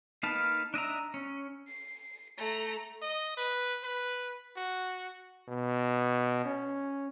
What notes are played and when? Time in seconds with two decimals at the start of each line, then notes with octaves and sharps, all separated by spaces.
0.23 A#3 D#4 B4 F5 A5
0.74 D4 D#5 E5 A#5
1.14 C#4
1.68 C7
2.38 A3 A#5
3.02 D#5
3.37 B4
3.84 B4
4.56 F#4
5.48 B2
6.45 C#4